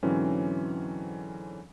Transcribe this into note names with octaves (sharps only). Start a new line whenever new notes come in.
G#2 D3 E3 F#3 C4 C#4